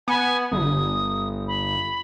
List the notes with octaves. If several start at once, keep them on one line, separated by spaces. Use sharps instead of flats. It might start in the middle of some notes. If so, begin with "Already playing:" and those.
B3 G#5
G1 D#6
B5